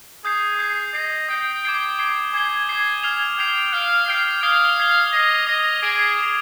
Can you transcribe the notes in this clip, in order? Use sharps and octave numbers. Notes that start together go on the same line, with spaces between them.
G#4 D#6 G6 C7
D#6 G6 C7
D#5 D#6 G6 C7
G5 D#6 G6 C7
D6 G#6 C7 G7
D6 G#6 C7 G7
G#5 D6 G#6 C7 G7
D6 G#6 C7 G7
F6 C7 F7
G5 F6 C7 F7
F5 F6 C7 F7
G5 F6 C7 F7
F5 D#6 G#6 C7 G7
D#6 G#6 C7 G7
D#5 D#6 G#6 C7 G7
D#5 D#6 G#6 C7 G7
G#4 D6 G#6 D7 F7
D6 G#6 D7 F7